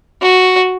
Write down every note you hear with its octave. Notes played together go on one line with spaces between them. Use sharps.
F#4